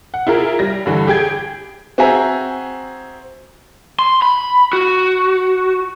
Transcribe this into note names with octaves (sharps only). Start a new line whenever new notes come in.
F#5
E4 F4 G#4 A#4
G3 A#6
G2 D3 E3
G4 G#4 G5 G#6
C4 F#4 G#4 E5 G#5 A#5
C6
B5
F#4